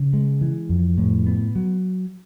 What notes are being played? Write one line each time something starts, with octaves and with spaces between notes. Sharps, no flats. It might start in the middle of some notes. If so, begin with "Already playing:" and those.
Already playing: C#3
G#3
E3
F2
A2
B3
F#3